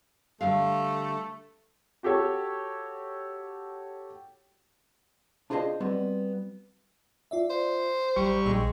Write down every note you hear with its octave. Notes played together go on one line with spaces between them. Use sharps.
D3 G3 A3 F5
F#4 G4 A4 C#5
D4 F4 G#4 C5 D#5 F5
G3 B3 C4 F#4
F4 D5 E5
C5
A1 G3 C#6
A#1 G#3 E6